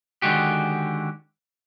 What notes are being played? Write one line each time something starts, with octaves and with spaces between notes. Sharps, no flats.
D3 D#3 G#3 F#4 G4